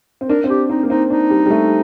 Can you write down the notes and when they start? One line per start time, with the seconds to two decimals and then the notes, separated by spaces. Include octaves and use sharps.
0.21 C4
0.29 D4 A#4
0.44 C4
0.49 D4 G4
0.70 C4 D#4
0.83 A#3
0.90 C4 D#4
1.10 D4 D#4
1.30 G3
1.46 G3
1.50 A3